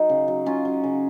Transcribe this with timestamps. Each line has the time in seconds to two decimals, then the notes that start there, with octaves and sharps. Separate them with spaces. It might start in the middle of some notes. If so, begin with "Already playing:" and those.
Already playing: F#3 D#4
0.09 C#3
0.28 F#3
0.46 C#3 C#4 F4
0.65 F#3
0.83 C#3